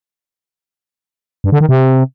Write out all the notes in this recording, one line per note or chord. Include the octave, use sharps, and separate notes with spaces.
G2
D3
D#3
C3